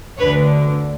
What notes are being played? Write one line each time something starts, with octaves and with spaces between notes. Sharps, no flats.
D2 D3 B4 C#5